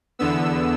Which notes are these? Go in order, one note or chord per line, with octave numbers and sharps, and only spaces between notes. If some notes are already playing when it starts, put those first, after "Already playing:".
E2 D3 B3 E6